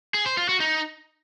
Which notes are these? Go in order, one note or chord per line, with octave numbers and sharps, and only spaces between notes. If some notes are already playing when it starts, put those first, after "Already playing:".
G#4
C5
F4
F#4
D#4